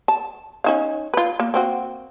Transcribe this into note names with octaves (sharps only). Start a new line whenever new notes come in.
A5
C#4 D#4 F5
F4 B4
A#3
A#3 C4 F#4